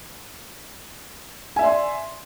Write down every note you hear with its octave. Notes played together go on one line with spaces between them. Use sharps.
D5 E5 G#5 C6